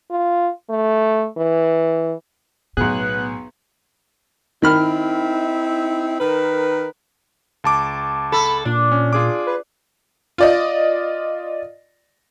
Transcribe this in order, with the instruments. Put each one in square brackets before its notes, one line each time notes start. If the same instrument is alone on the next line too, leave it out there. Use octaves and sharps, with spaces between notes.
[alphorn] F4
A3
E3
[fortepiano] B1 G#4 [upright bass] A2 [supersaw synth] B3 [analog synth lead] F#6
[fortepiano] D#3 B5 F6 [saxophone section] C4 D#4 E4
[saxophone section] D#3 A#4 B4
[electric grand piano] C#2 A5 D6
[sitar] A4 [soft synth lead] B5
[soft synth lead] A#2 [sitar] D4
[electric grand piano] C#4
F4 G#4 D6
[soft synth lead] B4
[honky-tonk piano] F4 D5 D#5